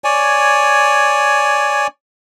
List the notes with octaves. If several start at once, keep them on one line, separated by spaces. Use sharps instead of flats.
C#5 D5 G#5